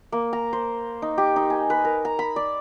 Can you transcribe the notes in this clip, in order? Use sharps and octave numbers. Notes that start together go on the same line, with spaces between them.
A#3
A#5
C5
D#4
G4
D#4
G#5
B4
A#4
A#5
B5
D5